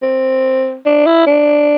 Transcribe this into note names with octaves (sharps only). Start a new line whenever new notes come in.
C4
D4
E4
D4